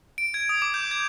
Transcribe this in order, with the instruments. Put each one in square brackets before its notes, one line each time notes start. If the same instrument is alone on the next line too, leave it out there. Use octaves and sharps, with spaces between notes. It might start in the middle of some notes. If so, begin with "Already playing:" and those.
[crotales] D7
G#6
D#6
D6
G6
G#6